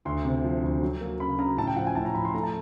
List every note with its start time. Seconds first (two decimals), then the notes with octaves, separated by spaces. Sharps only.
0.05 D2 C6
0.25 C3
0.44 F3
0.63 D2
0.82 F#3
1.01 A#3
1.20 C#3 B5
1.39 C#3 A#5
1.58 A2 A5
1.67 G5
1.76 F3 F#5
1.87 G#5
1.95 A2 A5
2.05 A#5
2.14 F3 B5
2.25 C6
2.34 A3 A#5
2.43 A5